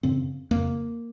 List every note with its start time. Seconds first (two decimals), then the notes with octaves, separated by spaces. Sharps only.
0.03 F#2 C#3 C4
0.51 F2 C#3 A#3